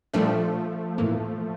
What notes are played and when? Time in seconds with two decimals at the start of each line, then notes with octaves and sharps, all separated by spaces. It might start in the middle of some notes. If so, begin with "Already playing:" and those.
0.13 A#2 F3 G3 A3 D4
0.98 A2 E3 A#3